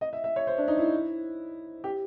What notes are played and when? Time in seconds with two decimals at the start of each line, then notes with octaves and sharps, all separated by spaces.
0.01 D#5
0.13 E5
0.24 E5
0.36 C#5
0.47 C5
0.58 D4
0.68 D#4
0.77 E4
1.84 G4